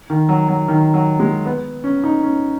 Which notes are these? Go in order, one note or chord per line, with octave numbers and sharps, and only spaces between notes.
D#3
F#3
F#3
D#3
F#3
G#3
B3
C#4
D#4
C#4